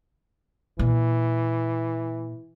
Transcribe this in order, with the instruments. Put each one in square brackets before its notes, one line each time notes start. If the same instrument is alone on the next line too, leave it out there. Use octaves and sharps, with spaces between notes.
[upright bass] A#2 [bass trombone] E3